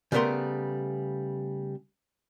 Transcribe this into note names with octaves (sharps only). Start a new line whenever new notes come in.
C#3 G3 A3 B3 A#4 C6